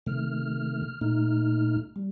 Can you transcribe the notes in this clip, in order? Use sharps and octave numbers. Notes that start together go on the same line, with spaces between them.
C3 D#3 A3 F6
A#2 A3 D#4
G3